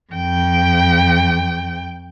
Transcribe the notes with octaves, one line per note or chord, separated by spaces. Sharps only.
F2 G5